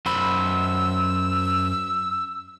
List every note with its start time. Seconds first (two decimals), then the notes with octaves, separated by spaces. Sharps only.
0.06 F#2 C5 B5 E6